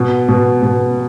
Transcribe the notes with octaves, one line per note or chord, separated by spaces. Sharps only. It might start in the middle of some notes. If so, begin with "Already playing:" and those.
Already playing: B2
B2
B2